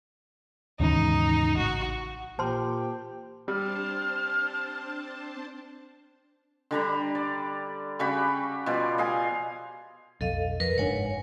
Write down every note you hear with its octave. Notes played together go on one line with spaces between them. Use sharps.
D#2 G#2 C#3 E3 D#4
A1 F#4
A#2 G4 C5 A5 C6
G3 C4 D4 C5 A5 F6
D3 G3 A#5 B5
D5
C#3 G3 F#4 B5
B2 F3 G3 D5
D#5 F5 G#5
B1 F2 A4 D#5 F5
F2 A#4 B4
F#1 G#2 D4 C#5 F#5 G#5